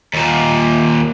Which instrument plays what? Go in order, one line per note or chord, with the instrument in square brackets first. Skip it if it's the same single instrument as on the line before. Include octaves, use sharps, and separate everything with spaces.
[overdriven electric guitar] D#2 A#2